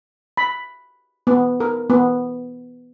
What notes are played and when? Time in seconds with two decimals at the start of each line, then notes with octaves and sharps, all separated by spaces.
0.37 B5
1.27 B3
1.60 A#4
1.90 B3